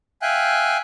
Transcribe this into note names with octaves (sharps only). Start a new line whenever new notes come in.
E5 F5 G5 G#5 F#6